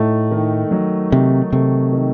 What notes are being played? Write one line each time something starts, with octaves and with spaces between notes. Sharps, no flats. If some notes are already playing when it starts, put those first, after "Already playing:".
Already playing: A2 A3 D#4
D#3
F#3
C3 D#4
C3 A3
D#3